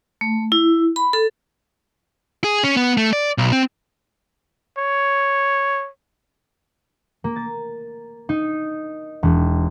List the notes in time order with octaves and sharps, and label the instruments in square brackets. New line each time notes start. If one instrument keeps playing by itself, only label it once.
[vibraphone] A3
E4
B5
A4
[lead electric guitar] G#4
C#4
B3
A3
D5
B1
C4
[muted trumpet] C#5
[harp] A#3
A6
D#4
E1